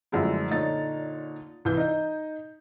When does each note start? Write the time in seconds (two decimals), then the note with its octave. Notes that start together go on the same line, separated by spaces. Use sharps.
0.12 F#2 D3 F3 G#3 A3 E4
0.50 A#2 D3 D#4 C#5 A6
1.65 C2 E3 G6
1.77 D#4 D#5